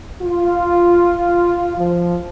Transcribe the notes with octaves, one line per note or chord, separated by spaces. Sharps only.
F4
F3